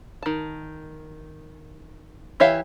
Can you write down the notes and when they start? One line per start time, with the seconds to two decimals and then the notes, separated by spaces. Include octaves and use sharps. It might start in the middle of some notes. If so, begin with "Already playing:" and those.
0.23 D#3 A5
2.40 E3 G4 C#5 E5 F5